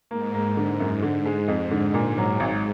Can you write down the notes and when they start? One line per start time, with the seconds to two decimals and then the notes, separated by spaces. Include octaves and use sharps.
0.11 G#2 A#3
0.34 A#3
0.57 D3
0.80 F#2
1.03 D3
1.26 G#3
1.48 F2 G#2
1.71 D3
1.94 A#2
2.18 F#3
2.40 G#1